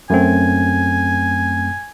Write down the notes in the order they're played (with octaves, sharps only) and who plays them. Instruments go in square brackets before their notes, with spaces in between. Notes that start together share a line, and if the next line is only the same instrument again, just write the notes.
[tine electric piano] F#2 A3 C4 [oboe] G#5